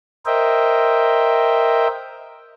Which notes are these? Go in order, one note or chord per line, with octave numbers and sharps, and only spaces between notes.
A#4 C5 D#5 E5 G5